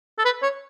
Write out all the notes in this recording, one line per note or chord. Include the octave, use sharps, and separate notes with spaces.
A4
B4
C#5